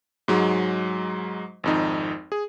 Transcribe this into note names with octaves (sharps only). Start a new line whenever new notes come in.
G#2 F#3 G#3
G#1 F2 D#4
G#4